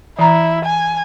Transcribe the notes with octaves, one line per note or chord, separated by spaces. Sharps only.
E3 E4 A#5
G#5